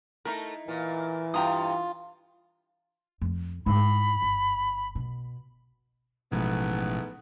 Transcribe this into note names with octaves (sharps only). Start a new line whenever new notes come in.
A3 D#4 E4 A#4
A#2 E3 A#4
G2 F4 G5 A#5 D#6
F2
G#2 E4 B5
G1
B2
A1 G#2 B2 F3 G#3 A3 B3